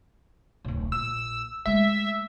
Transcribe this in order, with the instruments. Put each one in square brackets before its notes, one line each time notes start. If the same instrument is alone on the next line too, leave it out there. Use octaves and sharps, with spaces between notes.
[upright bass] D1 B1
[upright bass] A#1 [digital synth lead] E6
[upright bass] G#3 A3 [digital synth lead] E5